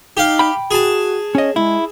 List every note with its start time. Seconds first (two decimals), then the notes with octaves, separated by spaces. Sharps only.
0.17 D#4 G4 F5
0.39 G5 B5
0.71 F#4 G#4 A5
1.35 C#4 C#5 D#5
1.56 G#3 E4